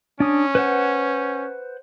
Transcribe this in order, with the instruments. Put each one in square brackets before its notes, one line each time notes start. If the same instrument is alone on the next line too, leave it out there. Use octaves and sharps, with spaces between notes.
[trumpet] C#4 [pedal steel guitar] D4 D#6
[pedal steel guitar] B4 C5 F#5